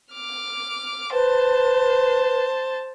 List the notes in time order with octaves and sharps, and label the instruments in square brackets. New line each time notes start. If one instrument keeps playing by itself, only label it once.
[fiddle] D6 F6
[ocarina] B4 [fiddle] C5 A5